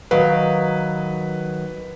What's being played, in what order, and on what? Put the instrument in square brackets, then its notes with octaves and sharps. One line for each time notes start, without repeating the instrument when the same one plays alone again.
[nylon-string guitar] D#3 F#3 F5 [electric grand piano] B4